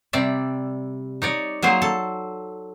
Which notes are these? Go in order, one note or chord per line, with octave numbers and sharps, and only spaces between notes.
C3 G3 D5 E5
D#4 C#5 D5
F#3 A#3 G#4 C5
A4